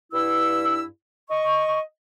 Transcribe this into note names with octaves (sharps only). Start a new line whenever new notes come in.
G2 E4 E6
D#5 C#6